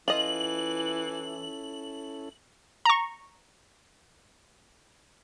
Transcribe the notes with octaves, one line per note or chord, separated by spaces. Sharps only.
E3 C#4 E4 F4 A4 D#5 F#7
A#5 C#6